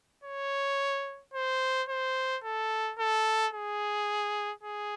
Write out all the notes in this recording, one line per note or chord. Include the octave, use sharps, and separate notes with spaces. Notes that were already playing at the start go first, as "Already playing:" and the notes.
C#5
C5
C5
A4
A4
G#4
G#4